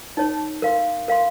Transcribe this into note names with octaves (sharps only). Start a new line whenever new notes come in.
D#4 A#4 C#5 A5
A#4 F5 C6
A#4 F5 C6